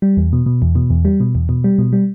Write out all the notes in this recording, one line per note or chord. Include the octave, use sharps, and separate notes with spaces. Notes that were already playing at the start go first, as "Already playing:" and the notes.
G3
E2
B2
B2
E2
B2
E2
G3
B2
E2
B2
G3
B2
G3